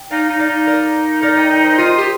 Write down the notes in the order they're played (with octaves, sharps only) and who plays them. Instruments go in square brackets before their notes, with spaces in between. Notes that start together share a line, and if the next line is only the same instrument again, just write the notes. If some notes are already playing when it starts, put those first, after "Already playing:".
Already playing: [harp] G5
[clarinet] D#4 [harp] D5 F5
[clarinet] D#4
[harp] D5 F5
[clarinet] D#4
[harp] A#4 D5
A#4 D5
D#5 G5
D#5 G5
C5 D#5
[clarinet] F4 [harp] C5 D#5
[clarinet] G4